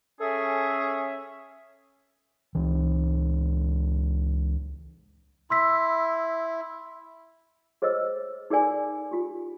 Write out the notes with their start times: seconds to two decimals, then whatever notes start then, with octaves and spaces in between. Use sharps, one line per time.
0.20 C#4 G#4 A4 E5
2.55 C#2 E3
5.50 E4 C6 E6 B6
7.82 G#4 C5 C#5 D#5 E6
8.50 D#4 G#4 A#4 D5 G#5 D6
9.11 F4 G4